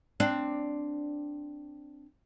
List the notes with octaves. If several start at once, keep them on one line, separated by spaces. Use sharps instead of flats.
C4 D4